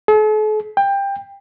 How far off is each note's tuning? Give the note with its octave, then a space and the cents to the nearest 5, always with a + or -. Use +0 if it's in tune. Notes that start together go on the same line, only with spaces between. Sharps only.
A4 -45
G5 +20